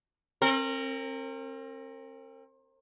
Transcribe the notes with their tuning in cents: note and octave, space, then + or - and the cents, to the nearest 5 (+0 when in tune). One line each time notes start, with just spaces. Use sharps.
C4 +35 A#4 -30